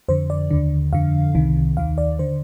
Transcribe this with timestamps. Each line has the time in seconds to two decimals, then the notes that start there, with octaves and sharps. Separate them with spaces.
0.08 F2 D3 C5
0.30 D5
0.51 D#2 D3
0.93 F2 D3 F5
1.35 C2 C3 D#3
1.77 D#2 D#3 F5
1.98 D5
2.19 D3 C5